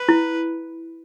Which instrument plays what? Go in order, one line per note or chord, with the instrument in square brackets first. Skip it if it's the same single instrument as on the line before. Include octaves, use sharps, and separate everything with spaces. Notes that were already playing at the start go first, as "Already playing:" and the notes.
Already playing: [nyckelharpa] B4
[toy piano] E4